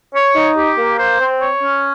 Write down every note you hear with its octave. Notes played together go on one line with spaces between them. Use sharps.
C#5
D#4
G4
A#3
C5
C4
C#5
C#4